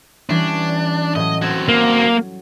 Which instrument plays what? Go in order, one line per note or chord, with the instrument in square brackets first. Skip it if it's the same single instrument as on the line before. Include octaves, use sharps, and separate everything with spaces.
[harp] E3 G3 C#4 [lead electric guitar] D4
[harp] A2 F#3 [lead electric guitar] D#5
[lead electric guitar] C4 F#4 [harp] G#6 A6 E7
[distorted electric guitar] A#3